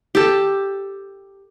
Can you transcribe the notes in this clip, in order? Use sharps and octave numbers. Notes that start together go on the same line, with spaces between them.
G4 A4